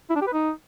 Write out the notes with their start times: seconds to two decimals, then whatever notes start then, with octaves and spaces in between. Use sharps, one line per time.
0.10 E4
0.15 D4
0.21 G4
0.27 B4
0.33 D#4